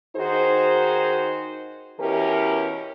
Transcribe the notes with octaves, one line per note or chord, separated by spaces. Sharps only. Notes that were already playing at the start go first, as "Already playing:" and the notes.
D#3 D#4 F#4 G#4 C5
B2 E3 C#4 G4 A#4